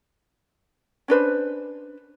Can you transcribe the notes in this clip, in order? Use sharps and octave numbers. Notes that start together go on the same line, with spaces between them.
C#4 D4 B4 C5